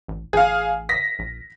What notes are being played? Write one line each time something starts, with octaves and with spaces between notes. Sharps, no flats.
A1
A1 G#4 F5
A#6 B6
A#1